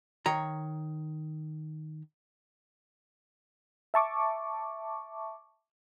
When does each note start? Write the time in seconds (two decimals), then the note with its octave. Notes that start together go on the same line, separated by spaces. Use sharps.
0.26 D#3 C#5 A#5
3.94 E5 A5 C#6 D6